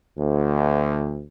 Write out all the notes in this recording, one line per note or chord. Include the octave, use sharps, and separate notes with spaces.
D2